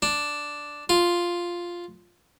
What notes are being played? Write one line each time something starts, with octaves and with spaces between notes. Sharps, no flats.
D4
F4